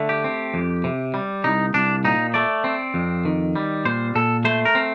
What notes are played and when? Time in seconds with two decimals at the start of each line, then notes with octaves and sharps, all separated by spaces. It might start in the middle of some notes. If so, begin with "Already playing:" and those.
Already playing: D3 A3
0.09 G4
0.24 C4
0.54 F2
0.84 C3
1.14 G3
1.44 C2 D#4
1.74 C2 D4
2.04 A#2 D#4
2.34 A3 D5
2.64 C4
2.94 F2
3.25 D#3
3.56 G3
3.85 A#2 C5
4.15 A#2 A4
4.45 A3 C5
4.65 A#4
4.75 C4